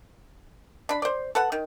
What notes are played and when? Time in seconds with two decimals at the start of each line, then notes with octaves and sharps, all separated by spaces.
0.89 D4 B5
1.02 C5 D5
1.35 A4 B4 F#5
1.52 D#3